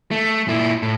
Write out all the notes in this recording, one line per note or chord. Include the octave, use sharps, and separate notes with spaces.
A3
A#2 E4
A2